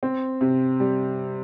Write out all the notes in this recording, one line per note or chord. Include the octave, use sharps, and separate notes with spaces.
C4
C3
G3